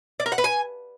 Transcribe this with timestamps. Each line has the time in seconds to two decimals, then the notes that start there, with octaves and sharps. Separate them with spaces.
0.20 D5
0.26 A#4
0.32 F#5
0.38 B4
0.44 G#5